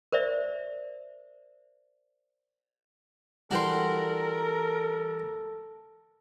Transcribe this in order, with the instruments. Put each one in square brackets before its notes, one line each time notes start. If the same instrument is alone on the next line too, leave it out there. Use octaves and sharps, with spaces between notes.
[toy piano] A#4 C5 D5 E5
[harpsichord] E3 G3 D4 [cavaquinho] F#4 G5 C6 [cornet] A4 [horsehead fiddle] A#4